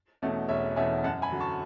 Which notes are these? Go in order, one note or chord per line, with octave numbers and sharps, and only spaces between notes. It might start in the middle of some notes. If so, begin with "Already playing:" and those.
E2 B2 A3 C#4
E1 C#5 E5
E2 B2 A3 C#4 E5 G#5
F#2 F#5 A5
G#5 B5
D3 F#3
A5 C#6